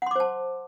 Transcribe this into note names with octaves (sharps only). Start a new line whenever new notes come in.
C5 F#5 A5 C6 D6